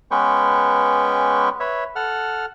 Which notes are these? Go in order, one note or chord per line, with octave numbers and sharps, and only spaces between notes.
G#3 B3 C#4 B4 G5 C#6
B4 C#5 E5
A4 F#5 F6